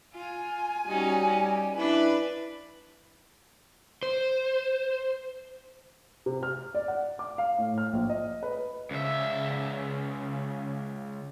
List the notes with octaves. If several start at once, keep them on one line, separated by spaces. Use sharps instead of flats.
F4 G#5
G3 C#4 D#4 F#4
G4
D4 E4 B4
C5
C3
F6
D5
F#5
D6
F5
A2
F6
A#1
D#5
B4
C#2 C#3 E5